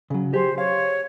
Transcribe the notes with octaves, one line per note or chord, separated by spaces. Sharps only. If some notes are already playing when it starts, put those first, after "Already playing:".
C#3 F#3
G4 G#4 C5
C#5 F5